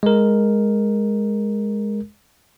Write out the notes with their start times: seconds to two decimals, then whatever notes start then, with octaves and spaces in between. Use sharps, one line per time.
0.03 G#3 A#4